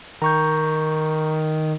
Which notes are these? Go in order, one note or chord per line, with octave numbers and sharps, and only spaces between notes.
D#3 A#5 C#6 G6